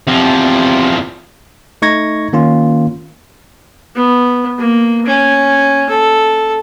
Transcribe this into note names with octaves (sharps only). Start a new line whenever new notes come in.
E2 C3 F3
A3 D#4 C#6 G#6 A#6
D#3 A#3 C#4 F4
B3
A#3
C#4
A4